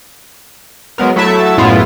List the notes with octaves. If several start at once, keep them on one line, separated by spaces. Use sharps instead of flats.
F#3 G#3 B3 A#4
F#3 A3 E4 E5 A5
F#2 A2 G#3 B3 E4 F4